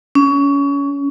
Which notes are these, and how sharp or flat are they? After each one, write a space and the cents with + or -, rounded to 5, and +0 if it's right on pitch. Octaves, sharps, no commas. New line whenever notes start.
C#4 +25